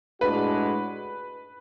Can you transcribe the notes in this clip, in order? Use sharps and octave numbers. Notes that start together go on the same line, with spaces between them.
A2 G#3 D4 F#4 B4